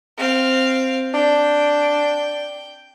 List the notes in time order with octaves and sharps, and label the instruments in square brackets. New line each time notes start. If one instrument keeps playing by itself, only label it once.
[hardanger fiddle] C4 F5
[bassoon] D4 [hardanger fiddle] G5